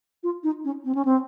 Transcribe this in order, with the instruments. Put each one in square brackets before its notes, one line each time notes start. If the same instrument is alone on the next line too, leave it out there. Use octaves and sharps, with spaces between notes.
[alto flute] F4
D#4
C#4
C4
C#4
C4